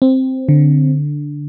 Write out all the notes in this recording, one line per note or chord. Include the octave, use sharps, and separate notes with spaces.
C4
D3